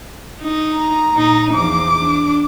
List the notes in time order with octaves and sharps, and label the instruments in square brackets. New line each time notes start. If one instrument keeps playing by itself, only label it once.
[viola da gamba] D#4
[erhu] A#5
[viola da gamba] A#2 D#4
[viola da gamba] E2 F3 [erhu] D6
[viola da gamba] D4